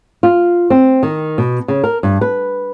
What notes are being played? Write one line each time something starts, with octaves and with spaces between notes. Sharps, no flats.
F4
C4
D#3
B2
C#3
A#4
G2
B4